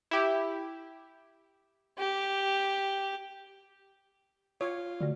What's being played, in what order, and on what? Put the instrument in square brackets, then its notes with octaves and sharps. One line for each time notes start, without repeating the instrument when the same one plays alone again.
[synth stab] E4 G4
[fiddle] G4
[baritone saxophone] F4 [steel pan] C#5
[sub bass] D3 [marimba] A3 F#4 D5